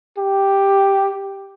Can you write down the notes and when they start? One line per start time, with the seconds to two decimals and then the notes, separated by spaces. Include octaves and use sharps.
0.19 G4